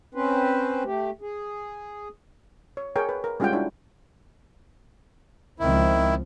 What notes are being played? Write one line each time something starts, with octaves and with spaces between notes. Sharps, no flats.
C4 C#4 B4 C5
A3 G4
G#4
C#5
G#4 A#4 C#5 G5
B4
A#4
G3 G#3 C#4 F4 F#5 G5
D4 E4 F#4 C#5
C#2 D#3 F3 C4 E4